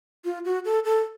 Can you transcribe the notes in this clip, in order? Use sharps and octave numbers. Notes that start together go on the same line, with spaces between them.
F4
F#4
A4
A4